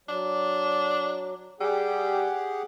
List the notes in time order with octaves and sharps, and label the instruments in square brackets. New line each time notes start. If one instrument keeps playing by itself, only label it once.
[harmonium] F#3 [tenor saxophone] D4
[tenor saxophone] G3 [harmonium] G4 G#4 F#5